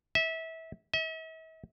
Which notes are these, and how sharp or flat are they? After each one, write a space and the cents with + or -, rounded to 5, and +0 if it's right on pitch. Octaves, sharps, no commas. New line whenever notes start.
E5 -25
E5 -45